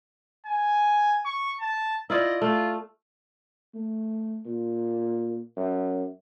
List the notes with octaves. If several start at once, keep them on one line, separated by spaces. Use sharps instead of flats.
G#5
C#6
A5
E4 F4 D5 D#5
A3 F4
A3
A#2
F#2